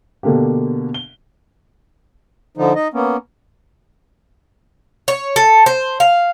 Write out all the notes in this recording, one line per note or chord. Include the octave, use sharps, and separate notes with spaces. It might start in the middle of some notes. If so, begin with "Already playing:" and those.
B2 D3 A#3 D4 G4
G7
D3 F3 D#4
D#4 D#5
A#3 B3 C#4
C#5
A4
C5
F5